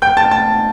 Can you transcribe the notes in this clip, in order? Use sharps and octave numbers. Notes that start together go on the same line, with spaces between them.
G5 G6
A5 A6
A5 A6